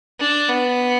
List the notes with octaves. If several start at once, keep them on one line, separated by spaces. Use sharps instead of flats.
D4
B3